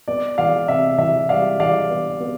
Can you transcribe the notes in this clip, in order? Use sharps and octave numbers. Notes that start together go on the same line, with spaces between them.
B3 D5
E3 D5 F5
C3 E5
E3 E5
G3 D5 F5
E3 D5 F5
B3
B3